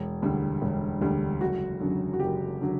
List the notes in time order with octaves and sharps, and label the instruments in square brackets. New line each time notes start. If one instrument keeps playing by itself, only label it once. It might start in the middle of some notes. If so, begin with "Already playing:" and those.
Already playing: [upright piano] E1
D2 D3 G3
E1
D2 D3 G3
F#1 F#4
F#2 D3 F#3
F#4
F#1 G4
D3 F#3